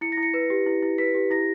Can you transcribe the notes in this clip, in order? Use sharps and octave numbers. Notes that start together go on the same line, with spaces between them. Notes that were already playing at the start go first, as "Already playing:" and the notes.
E4 C#7
A#6
E4
C#7
B4
G4
E4
E4
B4 B6
G4
E4 A#6